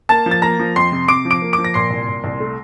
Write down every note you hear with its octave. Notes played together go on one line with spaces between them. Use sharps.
A#3 A5 A6
F3
A6
A#3 A#5 A#6
F3
F2 C6 C7
C3
C3 D6 D7
F3
D6 D7
A#3
D6 D7
F3
A#6
A#2 C6 C7
C2
A#2
C2
A3